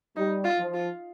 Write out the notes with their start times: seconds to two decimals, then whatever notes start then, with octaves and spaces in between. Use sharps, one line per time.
0.16 G3 D#4
0.44 F4
0.59 F3
0.74 F4